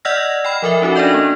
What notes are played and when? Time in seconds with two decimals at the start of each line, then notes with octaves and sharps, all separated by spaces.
0.05 D5 D#5 F#5 E6 F6 A#6
0.45 G5 B5 F6
0.62 F3 A4 A#4 E5
0.82 C#4 D#4 F#4 A4
0.96 D4 A4 D5 D#5 G6
1.14 A#3